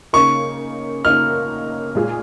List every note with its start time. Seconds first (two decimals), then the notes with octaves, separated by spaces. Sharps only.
0.13 C#3 A#3 D#4 A#4 C#6
1.04 C#3 A#3 D#4 A#4 F6
1.95 A#2 G#3 F4 G#4